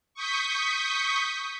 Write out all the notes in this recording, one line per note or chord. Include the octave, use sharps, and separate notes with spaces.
C#6 D#6 G6 B6